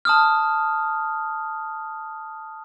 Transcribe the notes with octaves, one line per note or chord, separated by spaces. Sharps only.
A5 D#6 F6